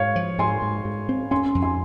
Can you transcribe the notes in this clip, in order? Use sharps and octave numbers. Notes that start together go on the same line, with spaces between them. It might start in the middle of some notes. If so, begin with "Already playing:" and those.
Already playing: G#2 C#5 F5
F3
G#2 G#5 C6
G#2
G#2
C4
C#4 G#5 C6
F2
G#5 C6